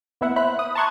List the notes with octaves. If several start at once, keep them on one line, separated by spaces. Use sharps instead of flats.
A#3 B3 E4 E5 F#5
C5 E5 B5 F#6
D#6
A5 A#5 C6 C#6 F#6 G#6